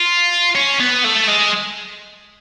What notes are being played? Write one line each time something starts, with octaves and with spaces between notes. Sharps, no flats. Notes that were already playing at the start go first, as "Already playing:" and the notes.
Already playing: F4
C#4
B3
A3
G#3